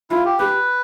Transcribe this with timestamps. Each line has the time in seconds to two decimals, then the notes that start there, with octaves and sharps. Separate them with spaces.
0.10 E4 F4
0.25 G4
0.39 G4 B4